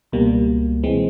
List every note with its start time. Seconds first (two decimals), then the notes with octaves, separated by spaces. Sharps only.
0.12 C#2 B2 G3 A#3
0.83 E3 G#3 C4